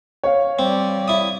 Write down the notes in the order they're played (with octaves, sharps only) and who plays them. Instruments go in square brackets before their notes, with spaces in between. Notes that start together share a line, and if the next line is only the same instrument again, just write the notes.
[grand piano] C#5 F5
[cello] G3 D5 [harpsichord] C4
[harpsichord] E4 D#6